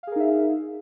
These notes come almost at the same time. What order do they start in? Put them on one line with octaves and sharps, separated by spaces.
F5 G#4 A#4 D#4 E5